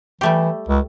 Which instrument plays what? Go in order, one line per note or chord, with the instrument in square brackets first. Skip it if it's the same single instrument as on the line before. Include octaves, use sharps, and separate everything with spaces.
[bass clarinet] E3 [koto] G3 A3 G4
[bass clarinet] C#2